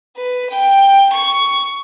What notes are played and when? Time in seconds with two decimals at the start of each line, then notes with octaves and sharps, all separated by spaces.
0.16 B4
0.50 G5
1.13 C#6